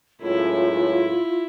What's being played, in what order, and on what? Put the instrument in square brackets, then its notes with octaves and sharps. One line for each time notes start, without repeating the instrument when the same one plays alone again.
[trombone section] C#2 F#2 A2 [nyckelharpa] E4 [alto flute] F4